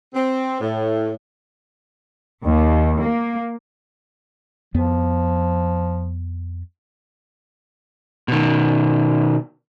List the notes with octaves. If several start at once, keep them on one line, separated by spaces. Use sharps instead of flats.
C4
A2
D#2
A#3
F2 F3 B3
B2 D#3